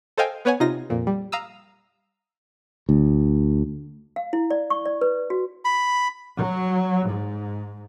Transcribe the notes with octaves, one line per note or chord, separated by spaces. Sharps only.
A4 C5 D#5 F5 G5 G#5
B3 B4 C#5 F#5 G#5
C3 D#4 F4 A#6
F2 A#2
G3
F5 A#5 D#6 E6
D2
F5
E4
D5
C#6
D5
B4
F#4
B5
F#3
G#2